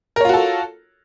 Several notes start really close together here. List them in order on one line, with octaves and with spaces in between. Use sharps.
A#4 C#5 F4 F#4 A4